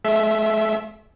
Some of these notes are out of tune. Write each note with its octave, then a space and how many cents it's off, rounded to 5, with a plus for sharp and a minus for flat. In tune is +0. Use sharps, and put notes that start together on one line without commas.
A3 -45 E5 +0